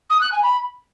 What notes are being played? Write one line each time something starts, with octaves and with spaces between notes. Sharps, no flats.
D#6
F#6
G#5
B5